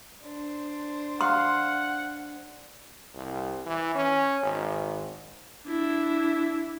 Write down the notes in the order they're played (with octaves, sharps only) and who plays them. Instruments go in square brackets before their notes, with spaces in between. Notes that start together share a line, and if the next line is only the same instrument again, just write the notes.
[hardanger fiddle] D4 C5
[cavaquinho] F5 [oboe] F#5 [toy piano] C6
[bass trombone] C2
E3
C#4
G#1
[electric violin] D4 E4